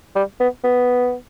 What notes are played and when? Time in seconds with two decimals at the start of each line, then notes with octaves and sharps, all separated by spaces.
0.15 G3
0.40 B3
0.64 B3